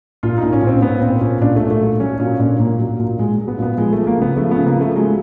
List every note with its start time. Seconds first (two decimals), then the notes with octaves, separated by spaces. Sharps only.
0.23 A#2 F4
0.38 D#4
0.43 A#2
0.52 C#4
0.62 A#2 C4
0.82 A#2 B3
1.01 A#2 C4
1.21 A#2 C#4
1.41 A#2 D4
1.56 A#2 A3
1.71 A3
1.81 F#3
2.00 F#3 C#4
2.20 A#2 C#4
2.40 A#2 D4
2.59 A#2 A#3
2.79 F#3
2.99 A#2
3.19 F#3 G#3
3.38 F#3
3.48 B3
3.58 A#2 B3
3.77 F3 G#3
3.93 F3 A3
4.07 A#3
4.18 C#3 B3
4.36 F3 A3
4.51 C#3 B3
4.66 A#3
4.76 F3 A3
4.96 F#3 G#3